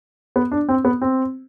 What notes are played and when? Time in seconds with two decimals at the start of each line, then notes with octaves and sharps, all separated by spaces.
0.36 B3
0.52 D4
0.69 C4
0.85 B3
1.02 C4